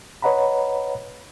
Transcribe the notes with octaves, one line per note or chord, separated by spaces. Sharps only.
B4 C#5 D#5 F#5 A#5 B5